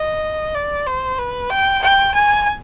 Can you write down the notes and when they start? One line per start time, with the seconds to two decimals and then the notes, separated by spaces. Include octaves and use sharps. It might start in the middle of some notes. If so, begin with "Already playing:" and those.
Already playing: D#5
0.54 D5
0.86 C5
1.19 B4
1.50 G5
1.83 G5
2.14 G#5